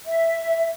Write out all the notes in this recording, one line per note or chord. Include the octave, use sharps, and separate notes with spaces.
E5